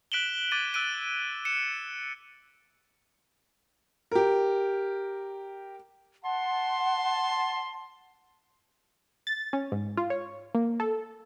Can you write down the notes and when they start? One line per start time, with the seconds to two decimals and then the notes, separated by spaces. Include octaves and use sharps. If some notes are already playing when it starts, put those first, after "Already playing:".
0.12 F#6 B6 D7 E7 F#7 G7
0.52 D6 G#6 A6 D#7
0.74 E6 F#6 D7 D#7
1.45 C#7 E7
4.12 G4 A#4
6.24 F#5 A5 C6
9.27 A6
9.53 C#4
9.72 G#2
9.97 F4
10.10 C#5
10.55 A#3
10.80 A4